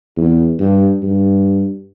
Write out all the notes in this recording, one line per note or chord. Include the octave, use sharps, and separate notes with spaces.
E2
G2
G2